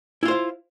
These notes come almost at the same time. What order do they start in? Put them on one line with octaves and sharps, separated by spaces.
E4 F4 C5 F5